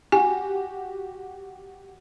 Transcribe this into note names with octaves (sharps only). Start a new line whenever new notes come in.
F#4 G4 G#5